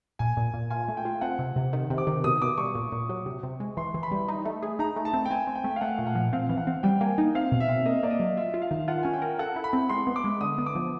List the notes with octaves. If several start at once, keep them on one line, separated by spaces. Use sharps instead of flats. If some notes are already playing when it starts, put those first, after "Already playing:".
A#2 G#5
A#2
A#2
F4 G#5
A3
G5
F4
C4 F#5
C3
C3
D#3
C3
D6
D#3
B2 D#6
B2 D6
G3 C#6
A#2
A#2
F#3
C3
C3
G#3
E3 C6
E3
B5
G3
D#4
A3
G#4
D#4 A#5
A3
A5
C4
G5
C4 G#5
C4
G5
A3
F5
A3 F#5
A#2
F#5
F3
C4 F5
E3
F#5
C4
G3 G5
A#3 G#5
D#4
C4 F5
B2
E5
C4
A#3 D#5
A#3 D5
D#5
F#3
F4 E5
F4
F5
D#3
F4 F#5
C#4 G#5
G5
A#4
A4 F#5
E4
B5
C4
G#3 C6
B3
D6
G#3
D3 D#6
B3
D6
F3